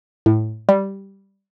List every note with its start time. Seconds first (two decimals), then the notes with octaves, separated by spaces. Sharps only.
0.26 A2
0.69 G3